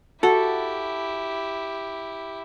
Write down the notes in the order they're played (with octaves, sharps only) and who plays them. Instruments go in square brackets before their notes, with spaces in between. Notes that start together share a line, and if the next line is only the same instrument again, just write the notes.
[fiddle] E4 G4 [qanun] F#4 [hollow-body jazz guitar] A4